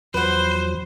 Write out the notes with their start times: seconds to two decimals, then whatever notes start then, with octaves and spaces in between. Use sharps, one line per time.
0.14 E2 F3 F#3 B4 C5 F#5